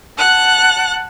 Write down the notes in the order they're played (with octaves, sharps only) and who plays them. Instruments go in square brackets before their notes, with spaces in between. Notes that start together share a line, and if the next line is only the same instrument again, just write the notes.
[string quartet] F#5 A5 F#6